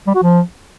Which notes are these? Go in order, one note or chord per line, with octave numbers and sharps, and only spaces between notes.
G3
F#4
F3